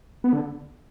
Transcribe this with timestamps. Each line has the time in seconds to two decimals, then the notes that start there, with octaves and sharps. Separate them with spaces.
0.24 B3
0.33 D3